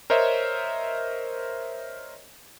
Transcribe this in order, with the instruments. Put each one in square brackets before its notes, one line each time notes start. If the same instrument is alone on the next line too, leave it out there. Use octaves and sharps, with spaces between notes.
[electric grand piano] A#4 C5 C#5 D#5 E5